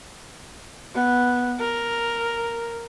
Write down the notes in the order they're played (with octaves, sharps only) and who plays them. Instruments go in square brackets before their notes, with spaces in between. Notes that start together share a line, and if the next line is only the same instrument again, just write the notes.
[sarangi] B3
A#4